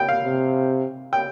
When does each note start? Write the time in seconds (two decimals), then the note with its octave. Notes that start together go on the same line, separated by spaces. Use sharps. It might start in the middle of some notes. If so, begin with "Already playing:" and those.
Already playing: G5
0.09 F5
0.24 C3
1.13 G5